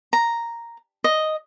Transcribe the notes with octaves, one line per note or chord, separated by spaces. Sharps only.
A#5
D#5